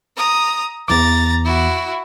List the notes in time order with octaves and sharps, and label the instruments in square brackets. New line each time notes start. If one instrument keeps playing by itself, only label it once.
[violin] A#5 D#6
[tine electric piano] E2 E3 D6 [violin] A#5 A6
[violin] E4 F#4